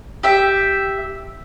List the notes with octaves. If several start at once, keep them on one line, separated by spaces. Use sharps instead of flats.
G4 E5